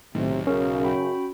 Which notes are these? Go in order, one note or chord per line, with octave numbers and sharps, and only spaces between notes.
B1 A2 C3 D#3
F#2 C#3 C#4 F#4 G#4 A#4
F#4 G5 B5